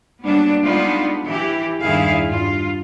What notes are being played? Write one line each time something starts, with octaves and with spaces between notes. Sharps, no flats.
F#3 G3 A#3 B3 D4
G3 G#3 B3 D4 D#4 F4
E3 G4
E2 G2 D#3 E4 G#4 F5
G2 F4